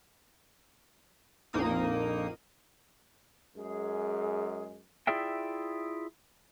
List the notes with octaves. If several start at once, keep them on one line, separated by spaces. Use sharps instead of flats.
A#1 F2 A#3 D#4 D#6
F#2 G#3 G#4
E4 F4 G#4 D5 E5 G5